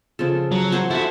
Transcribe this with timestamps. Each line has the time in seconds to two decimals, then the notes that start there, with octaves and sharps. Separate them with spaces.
0.19 C#3 F3 A4
0.52 F#3
0.72 F#4 C5 C#5
0.90 E4 F#4 A4 E5